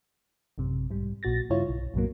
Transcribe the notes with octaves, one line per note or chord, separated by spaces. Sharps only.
A1 F#2 C3
B1 G#2 G3
A#1 A#2 F#4 A6 A#6
G2 C#3 E4 F4 C#5
B1
B1 F#2 A2 F#3 A#3